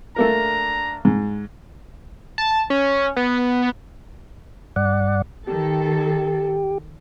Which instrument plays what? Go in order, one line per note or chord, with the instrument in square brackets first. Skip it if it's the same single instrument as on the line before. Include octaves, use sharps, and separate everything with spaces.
[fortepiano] A3 A#3 A#4 [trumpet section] D4 A#5
[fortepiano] G#2
[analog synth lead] A5
C#4
B3
[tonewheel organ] G2 D5 F#5
[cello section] D#3 A4 [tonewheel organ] G4